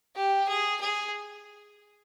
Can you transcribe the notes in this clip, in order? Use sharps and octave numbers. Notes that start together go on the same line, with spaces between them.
G4
G#4
G#4